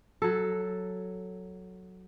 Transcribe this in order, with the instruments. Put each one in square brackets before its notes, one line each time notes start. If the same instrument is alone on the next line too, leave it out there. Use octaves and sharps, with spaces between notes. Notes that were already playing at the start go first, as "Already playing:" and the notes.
[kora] F#3 A4